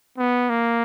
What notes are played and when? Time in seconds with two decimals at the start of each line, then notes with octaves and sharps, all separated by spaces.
0.18 B3
0.49 A#3